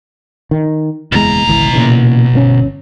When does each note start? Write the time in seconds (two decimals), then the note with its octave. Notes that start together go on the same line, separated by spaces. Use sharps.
0.51 D#3
1.12 F#1 E2 B2 G#3 A#5
1.47 G#1 C#2 E3
1.73 A#2 C#3 E3
2.33 G1 A#2 C#4